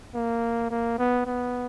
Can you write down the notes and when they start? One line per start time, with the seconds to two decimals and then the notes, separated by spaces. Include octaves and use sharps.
0.15 A#3
0.70 A#3
0.98 B3
1.26 B3